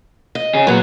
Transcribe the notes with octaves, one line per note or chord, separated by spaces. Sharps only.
D#5
C#4 G#4
A#2 F#3 B3